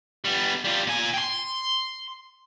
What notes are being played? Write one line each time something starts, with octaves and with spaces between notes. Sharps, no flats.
G3 B3
G3 F4
A#2 G#5
G5 C6